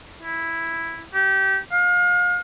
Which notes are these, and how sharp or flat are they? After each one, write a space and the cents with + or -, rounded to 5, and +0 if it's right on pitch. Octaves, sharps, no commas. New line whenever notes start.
E4 +0
G4 -25
F5 +35